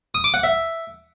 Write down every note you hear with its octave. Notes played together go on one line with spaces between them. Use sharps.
D#6
D6
F#5
E5